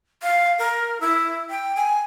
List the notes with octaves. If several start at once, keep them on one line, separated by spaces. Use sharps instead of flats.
F5
A#4
E4
G5
G#5